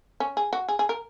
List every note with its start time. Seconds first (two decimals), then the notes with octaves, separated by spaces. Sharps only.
0.20 C#4
0.37 G#4
0.53 F#4
0.69 G#4
0.79 G#4
0.89 A#4